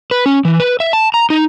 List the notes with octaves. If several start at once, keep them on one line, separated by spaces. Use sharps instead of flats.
B4
C#4
E3
B4
E5
A5
A#5
D#4